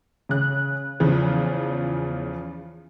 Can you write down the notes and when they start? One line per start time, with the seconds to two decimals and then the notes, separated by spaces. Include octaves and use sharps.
0.29 C#3 F#6
1.00 E2 C#3 F3